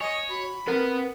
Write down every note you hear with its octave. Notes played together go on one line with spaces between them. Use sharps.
C#5 D#5 G#5
F#4 B5
B3 C4 A#4 B4